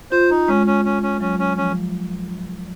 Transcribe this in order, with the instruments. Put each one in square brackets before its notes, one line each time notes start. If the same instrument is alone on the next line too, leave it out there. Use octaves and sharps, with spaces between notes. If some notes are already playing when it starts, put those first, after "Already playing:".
[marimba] F4 [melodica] C5
[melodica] D#4
[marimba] G#3 [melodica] C#4
[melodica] C#4
C#4
C#4
[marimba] F#3 [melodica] C#4
[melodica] C#4
[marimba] F3 [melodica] C#4